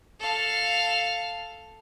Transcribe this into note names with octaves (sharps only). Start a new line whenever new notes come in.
A4 F5